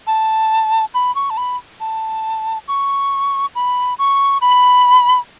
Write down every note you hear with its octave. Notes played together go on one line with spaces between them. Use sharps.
A5
B5
C#6
A5
B5
A5
C#6
B5
C#6
B5